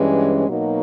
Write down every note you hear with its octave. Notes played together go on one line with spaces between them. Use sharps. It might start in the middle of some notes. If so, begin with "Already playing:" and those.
Already playing: G2 E3 G#3 C#4
B2 F#3 A#3 D#4 F#4